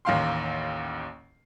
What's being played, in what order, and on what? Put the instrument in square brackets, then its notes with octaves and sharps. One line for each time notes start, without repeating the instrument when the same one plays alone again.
[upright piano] A1 D#2 A#3 F5 G5 C6